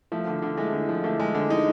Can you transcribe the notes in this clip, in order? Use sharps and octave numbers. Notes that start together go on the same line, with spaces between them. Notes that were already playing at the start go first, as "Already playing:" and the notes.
F3 A3
D3
D3
G#3 A3
D3
F3
D3 A3
G#3
D3
G#3 D#4